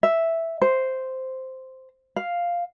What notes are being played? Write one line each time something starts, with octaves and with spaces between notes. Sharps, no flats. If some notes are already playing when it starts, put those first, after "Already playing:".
E5
C5
F5